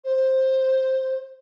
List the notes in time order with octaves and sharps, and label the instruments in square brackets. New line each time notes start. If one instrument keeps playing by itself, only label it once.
[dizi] C5